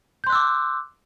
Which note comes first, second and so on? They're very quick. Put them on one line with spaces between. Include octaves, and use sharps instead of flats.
G6 C6 F#6 E6 D6